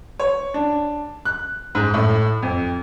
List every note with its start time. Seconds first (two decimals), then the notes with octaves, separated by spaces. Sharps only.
0.20 C#5
0.54 D4
1.25 F#6
1.75 G#2
1.94 A2
2.43 F2